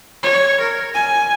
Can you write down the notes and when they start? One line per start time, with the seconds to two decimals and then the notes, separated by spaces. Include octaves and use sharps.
0.23 C#5
0.60 A#4
0.94 G#5